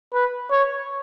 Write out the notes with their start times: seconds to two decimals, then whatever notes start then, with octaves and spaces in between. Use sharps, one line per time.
0.13 B4
0.51 C#5